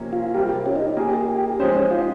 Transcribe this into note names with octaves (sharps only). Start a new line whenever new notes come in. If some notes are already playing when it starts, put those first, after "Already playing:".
Already playing: C3 F3 A#3 C#4
F4
C3 G3 C4 F4 G4 A#4
G4
C#4
D#4
A#3 F4 G4 G#4
G4
F3 G#3 C#4 D#4 G4 C5
C#4
F4